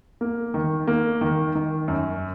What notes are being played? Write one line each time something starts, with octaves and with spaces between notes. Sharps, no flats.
A#3
D#3
A#3
D#3
D#3
F#2